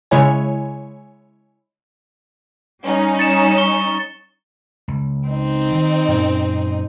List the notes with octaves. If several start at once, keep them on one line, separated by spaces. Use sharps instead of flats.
C#3 G#3 E4 C#5 G#5
G3 C#4 D#4
A6 C#7 E7
C#6 G7
C#2
C4 D#4
D#3
F#2 A#2 C#4